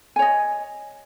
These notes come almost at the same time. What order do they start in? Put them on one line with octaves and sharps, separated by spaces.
G#5 C#5 D#5